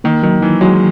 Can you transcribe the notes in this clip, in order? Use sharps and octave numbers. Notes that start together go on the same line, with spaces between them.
D#3 A#3
D#3 F#3
D#3 E3
F#3 G#3